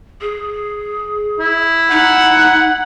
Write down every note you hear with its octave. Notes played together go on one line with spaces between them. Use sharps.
G#4
E4
D#4 F#5